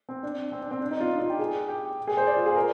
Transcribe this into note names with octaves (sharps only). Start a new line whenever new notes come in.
C4
D4
C4
D4
C4
D4
D#4
F4
D4
F4
G4
G#4
G4
G#4
C5
D5
F4
G#4
A#4